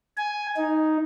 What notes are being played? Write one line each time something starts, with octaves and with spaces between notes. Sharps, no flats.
G#5
D#4